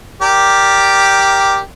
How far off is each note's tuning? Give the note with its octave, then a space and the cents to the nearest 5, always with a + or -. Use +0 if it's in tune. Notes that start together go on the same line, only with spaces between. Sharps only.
G4 +0 A#4 +0 D5 +0